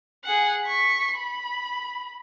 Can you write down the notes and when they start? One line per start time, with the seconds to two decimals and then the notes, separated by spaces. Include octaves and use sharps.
0.24 G#4 F#5
0.65 C#6 B6
1.17 B5